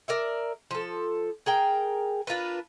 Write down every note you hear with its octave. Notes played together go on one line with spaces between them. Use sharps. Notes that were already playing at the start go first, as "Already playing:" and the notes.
A#4 D5 E5
F3 A4
G#4 A#4 G5
D4 F4 A#4 B4